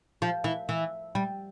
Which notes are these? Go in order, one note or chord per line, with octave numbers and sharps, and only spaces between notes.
F3
E3
E3
G3